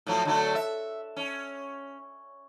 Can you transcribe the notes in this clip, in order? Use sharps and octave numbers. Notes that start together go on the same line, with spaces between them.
A2 F3 F#3
D3 F#3 A3
E5
C#4